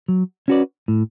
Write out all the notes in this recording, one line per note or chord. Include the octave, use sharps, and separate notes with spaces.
F#3
C#4 F#4 B4 D5
A2